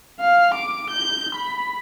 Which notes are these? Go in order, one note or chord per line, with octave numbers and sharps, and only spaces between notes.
F5
D6
G6
B5